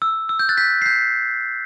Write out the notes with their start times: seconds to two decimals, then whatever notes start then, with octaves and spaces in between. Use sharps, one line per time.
0.02 E6
0.29 E6
0.39 G6
0.49 F#6 A6
0.57 G6 B6
0.82 C7
0.86 G6 B6